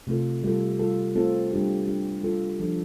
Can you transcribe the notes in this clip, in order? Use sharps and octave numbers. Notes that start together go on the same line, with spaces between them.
C3 A3 F4 A4
G3 F4 A4
G3 F4 A4
A3 C4 F4 A4
G3 D4 G4
G3 D4 G4
G3 F4 A4
F3 D4 A4